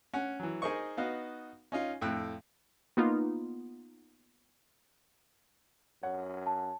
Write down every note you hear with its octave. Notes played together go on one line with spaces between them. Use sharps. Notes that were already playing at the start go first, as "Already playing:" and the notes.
C#4 F#5
E3 F#3
D#4 G#4 A#4 C5 D#5 C#6
B3 D#4 F#4 D#5 F5
C#4 D#4 F4
F2 A2 G5 E6 F#6
A#3 B3 D#4 F4
F#2 C#5 F#5
A5